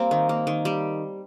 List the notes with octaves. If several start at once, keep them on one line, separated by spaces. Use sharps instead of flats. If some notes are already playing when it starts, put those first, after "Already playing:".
Already playing: G3 A#3 C4
D#3
A#3
D#3
G3